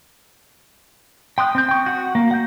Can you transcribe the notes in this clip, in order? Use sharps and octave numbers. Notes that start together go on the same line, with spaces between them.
G5 C6 D#6 F#6
C4 G6
G5 C#6
F#4 F#5
A#3
F#5 G6